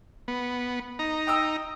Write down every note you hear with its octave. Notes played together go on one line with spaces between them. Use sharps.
B3
D#4 A#5
G5 D#6 E6